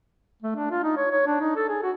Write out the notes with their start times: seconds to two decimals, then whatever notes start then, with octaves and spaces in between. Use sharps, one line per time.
0.42 A3
0.56 D4
0.71 F4
0.83 D#4
0.97 C#5
1.11 C#5
1.27 D4
1.40 D#4
1.56 A4
1.69 G#4
1.83 F#4